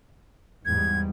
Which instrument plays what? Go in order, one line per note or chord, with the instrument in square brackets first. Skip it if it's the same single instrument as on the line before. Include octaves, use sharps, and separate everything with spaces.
[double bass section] E2 G#2 G3 [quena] G#6